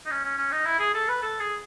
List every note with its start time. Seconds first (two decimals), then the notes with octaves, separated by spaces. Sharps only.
0.06 D#4
0.11 C#4
0.24 C#4
0.38 C#4
0.52 D#4
0.66 E4
0.79 G#4
0.94 A4
1.08 B4
1.22 A4
1.40 G#4